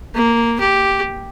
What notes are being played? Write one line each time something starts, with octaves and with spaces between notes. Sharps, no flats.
A#3
G4